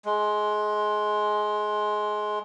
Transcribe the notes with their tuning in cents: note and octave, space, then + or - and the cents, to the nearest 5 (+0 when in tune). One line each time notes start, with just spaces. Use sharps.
G#3 +20